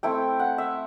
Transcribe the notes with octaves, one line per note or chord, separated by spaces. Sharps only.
A3 C4 E4 G5
F#5
E5